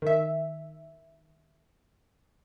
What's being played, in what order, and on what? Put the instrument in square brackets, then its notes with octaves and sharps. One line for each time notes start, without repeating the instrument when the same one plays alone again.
[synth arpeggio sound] D#3 E5